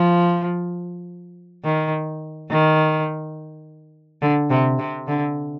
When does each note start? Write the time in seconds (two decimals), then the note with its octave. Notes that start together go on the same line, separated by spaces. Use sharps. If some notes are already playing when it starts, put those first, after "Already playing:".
Already playing: F3
1.64 D#3
2.50 D#3
4.22 D3
4.50 C3
4.79 C3
5.08 D3